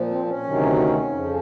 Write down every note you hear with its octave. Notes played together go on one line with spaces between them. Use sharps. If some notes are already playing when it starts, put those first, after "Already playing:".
Already playing: A#2 F3
C4
C#4
D2 C3 D#3 F#3
F2 C#3 F3